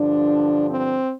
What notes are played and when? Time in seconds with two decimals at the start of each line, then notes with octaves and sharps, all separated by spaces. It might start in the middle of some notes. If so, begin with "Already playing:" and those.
Already playing: G2 D3 F3 D4
0.69 C4